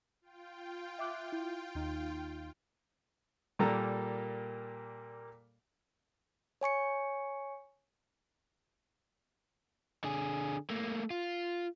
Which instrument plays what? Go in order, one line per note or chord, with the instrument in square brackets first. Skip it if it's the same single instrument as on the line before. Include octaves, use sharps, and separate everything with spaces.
[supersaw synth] F4 G5
[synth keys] E5 D6 F#6
E4 G6
D#2 D#4
[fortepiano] A#2 G3 A#3 A4 A#5
[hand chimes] C#5 G#5 C#6 C#7
[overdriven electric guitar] D3 G#4
A3 A#3
F4